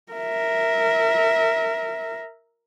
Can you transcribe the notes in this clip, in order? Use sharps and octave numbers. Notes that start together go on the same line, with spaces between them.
A#4 E5